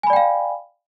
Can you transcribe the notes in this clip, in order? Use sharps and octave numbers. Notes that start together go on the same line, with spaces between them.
D5 F5 G5 G#5 B5